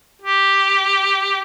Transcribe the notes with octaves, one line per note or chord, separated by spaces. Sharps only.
G4